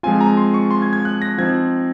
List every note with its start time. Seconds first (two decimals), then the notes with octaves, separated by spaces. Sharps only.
0.03 F3 G#3 C4 F4 G#5
0.21 A#5
0.37 C6
0.54 C#6
0.71 C6
0.82 G#6
0.93 G#6
1.05 F#6
1.22 A#6
1.38 F3 C4 D#4 G#6